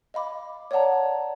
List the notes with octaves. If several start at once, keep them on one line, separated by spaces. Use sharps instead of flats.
D#5 F5 B5 D6
C#5 D5 F5 F#5 A5 A#5